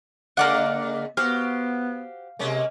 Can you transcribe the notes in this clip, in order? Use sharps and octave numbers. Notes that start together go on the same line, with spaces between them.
C#3 G#3 A#3 D5 F#5
B3 F#4 G4 C5 F5
C3 G#3 A#3 C#4